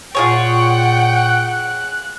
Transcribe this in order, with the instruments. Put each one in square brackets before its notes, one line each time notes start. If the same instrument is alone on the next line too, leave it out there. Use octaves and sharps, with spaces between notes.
[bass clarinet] A#2 [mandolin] F4 G#4 C#5 [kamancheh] F#5 G5
[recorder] F#6